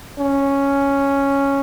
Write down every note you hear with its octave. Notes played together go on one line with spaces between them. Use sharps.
C#4